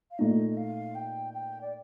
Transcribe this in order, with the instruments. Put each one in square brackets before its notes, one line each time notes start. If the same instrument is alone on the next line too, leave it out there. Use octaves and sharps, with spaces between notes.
[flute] F5
[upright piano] A#2 A3 D#4 [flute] D#5
[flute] D#5
F5
G5
G5
D5